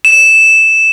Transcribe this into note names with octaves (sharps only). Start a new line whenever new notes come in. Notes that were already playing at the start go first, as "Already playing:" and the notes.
E7